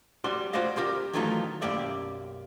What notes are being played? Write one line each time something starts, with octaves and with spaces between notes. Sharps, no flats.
G3 F#4 D5 C6
F4 F#4 C5 D5 D#5 F5
G3 F4 G4 A#4
D#3 E3 F#3 A3 D#4 F4
B1 F#2 A#3 G4 D5 E5